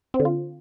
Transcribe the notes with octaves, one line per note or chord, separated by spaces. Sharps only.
C4
D3
F4